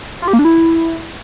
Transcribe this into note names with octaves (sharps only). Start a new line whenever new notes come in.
F4
G4
A#3
D4
E4